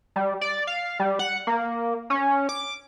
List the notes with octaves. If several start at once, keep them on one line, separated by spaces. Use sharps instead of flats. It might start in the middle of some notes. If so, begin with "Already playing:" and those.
G3
D5
F5
G3
F#5
A#3
C#4
D6